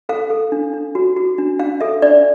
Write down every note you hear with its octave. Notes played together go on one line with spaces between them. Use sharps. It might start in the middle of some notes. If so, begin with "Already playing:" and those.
A4 F5
A4
D4
D4
F#4
F#4
D4
D4 F5
A4 E5
D4 D5